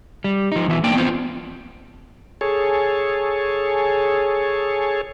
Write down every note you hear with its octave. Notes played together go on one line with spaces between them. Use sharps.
G3
F3 D#4
E2 E3 F#4 E5
A#3 D4 G5
B3 C4 F4 C5
G#4 A4 C#5